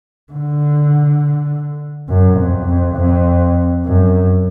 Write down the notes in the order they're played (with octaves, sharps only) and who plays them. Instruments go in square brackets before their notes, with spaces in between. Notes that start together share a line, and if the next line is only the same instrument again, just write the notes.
[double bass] D3
F#2
F2
F2
F2
F#2